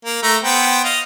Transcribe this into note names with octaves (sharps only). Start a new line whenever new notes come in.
A#3
A3 A#5
B3 C5 G5
D#5 F5